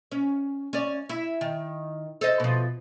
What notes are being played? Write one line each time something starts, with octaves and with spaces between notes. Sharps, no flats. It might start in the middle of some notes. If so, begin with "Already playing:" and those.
C#4
C#4 D5
E4
D#3
A4 C5 D#5
B2 F3